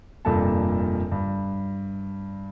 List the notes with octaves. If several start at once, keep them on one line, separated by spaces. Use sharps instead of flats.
F1 G2 A#2 A4 A#4 A5
G2